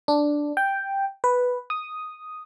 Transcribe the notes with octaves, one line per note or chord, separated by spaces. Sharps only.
D4
G5
B4
D#6